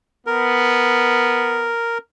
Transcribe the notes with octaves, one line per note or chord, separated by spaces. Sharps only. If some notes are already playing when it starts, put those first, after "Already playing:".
B3 A#4